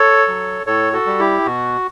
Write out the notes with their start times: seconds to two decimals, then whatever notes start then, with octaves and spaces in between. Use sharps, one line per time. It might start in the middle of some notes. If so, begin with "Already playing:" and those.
Already playing: A4 C#5
0.28 F#3
0.67 A2 A4 C#5
0.93 F#4 A4
1.06 G3
1.19 E4 G4
1.46 B2 F#4